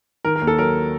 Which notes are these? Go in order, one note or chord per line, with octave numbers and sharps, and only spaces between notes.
D#3 A#4
A#4
D#2
A4
F#3 A#4